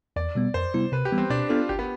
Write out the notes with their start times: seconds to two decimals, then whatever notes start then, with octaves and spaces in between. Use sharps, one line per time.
0.16 E2 D5
0.35 B2 G3 B3
0.54 F2 C5
0.74 C3 G3 B3 E4
0.92 C3 B4
1.05 G4
1.12 E3 G3 B3
1.18 C4
1.30 B2 D4
1.49 B3 D4 F4 A4
1.69 G1 G4
1.79 B3